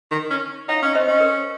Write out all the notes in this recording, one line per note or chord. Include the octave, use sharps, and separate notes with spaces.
D#3
C#4
D#4 C#5 F5
C#4
C4 C5 D#5
C#4
A#4